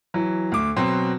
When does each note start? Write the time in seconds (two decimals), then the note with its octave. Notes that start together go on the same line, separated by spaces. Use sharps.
0.14 E3 F#3
0.52 D2 D6
0.76 B2 F#3 C4